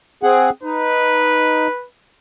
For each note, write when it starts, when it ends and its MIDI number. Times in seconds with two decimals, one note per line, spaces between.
0.23 0.50 60
0.23 0.50 68
0.23 0.50 78
0.63 1.67 63
0.63 1.86 71